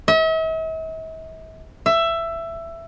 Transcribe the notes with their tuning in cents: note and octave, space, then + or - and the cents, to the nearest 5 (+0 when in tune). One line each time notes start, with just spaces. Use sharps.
E5 -45
E5 +15